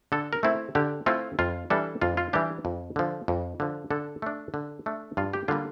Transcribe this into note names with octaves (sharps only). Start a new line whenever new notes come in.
D3 A4
A#4
A3 C4 E4
D3 G4
A3 C4 E4 F4
F2 F4
E3 G3 D4 A4
F2 F4
F4
E3 G3 D4 G4
F2
D3 F3
F2
D3 F3
D3 A4
A3 D4
D3
A3 D4
G2 F4
G4
D3 G3 A#3 F4